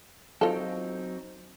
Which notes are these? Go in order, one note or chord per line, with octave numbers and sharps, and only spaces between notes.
F#3 C4 D#4 F4 A4